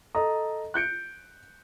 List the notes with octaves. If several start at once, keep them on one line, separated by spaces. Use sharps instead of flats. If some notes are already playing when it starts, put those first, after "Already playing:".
A4 D#5 A#5 D#6
F#6 G6 C#7 D7